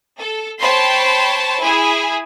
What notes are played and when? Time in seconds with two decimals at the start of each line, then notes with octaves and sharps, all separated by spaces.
0.19 A4
0.60 C5 C#5 G5 A5 B5 C6
1.62 E4 G#4 G#5